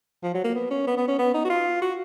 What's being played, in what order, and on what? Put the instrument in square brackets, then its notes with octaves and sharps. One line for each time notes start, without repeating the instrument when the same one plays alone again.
[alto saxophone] F3
F#3
A#3
B3
C#4
B3
B3
C#4
B3
D#4
F#4
F4
F#4